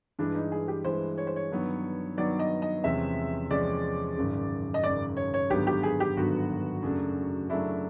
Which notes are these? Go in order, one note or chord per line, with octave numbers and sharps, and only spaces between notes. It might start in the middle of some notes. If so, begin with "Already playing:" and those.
G2 E3 G#3 D4
D#4
G#4
G4
G2 E3 G#3 C5
C#5
C5
C#5
G2 D#3 F#3 B3
G2 D#3 F#3 B3 D5
D#5
D#5
E2 C3 F3 G#3 C#4 E5
E2 C3 F3 G#3 C#4 D5
G#1 F#2 C#3
D#5
G#1 F#2 C#3 D5
C#5
C#5
G#1 G2 D3 F#3 B3 G4
G4
G#4
G4
G#1 G2 D3 F#3 B3 F#4
F#2 C#3 F#3 A3 D4
F#2 C#3 F#3 A3 D4 E4